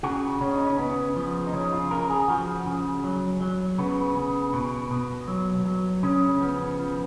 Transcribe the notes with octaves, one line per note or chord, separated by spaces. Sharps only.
C#3 F#4
C#3 C#4
D#4
C#4
C#3 B3
F3
D#4
C#3 C#4
F4
C#3 A#4
G#4
F3 F#4
C#3
F#3
F#3
C#3 B3
C#3
B2
B2
F#3
F#3
C#3 C#4
F3 B3
F3